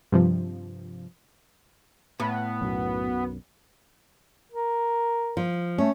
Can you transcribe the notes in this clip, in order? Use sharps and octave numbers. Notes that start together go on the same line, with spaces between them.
G2 C3 F3
A2 B3
B1 F#2 B2
A#4
F3
A3 C#4